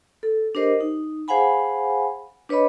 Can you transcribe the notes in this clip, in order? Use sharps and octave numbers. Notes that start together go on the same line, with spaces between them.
A4
D4 G4 A#4 C5 D#5
D#4
G#4 C5 F5 F#5 G#5 B5
D4 B4 C#5 D#5 B5